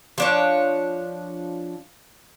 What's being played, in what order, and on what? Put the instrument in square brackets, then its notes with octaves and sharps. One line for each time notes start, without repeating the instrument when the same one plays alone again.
[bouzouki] F3 D4 C#5